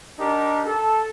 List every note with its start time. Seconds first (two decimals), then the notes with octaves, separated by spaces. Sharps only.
0.19 D4 D#4 G4 A#4
0.66 A4